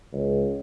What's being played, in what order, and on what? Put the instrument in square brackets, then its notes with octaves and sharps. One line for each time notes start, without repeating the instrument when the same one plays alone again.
[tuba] C#2